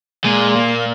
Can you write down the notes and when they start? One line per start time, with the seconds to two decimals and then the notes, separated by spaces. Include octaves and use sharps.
0.24 A#2 G#3
0.56 A#3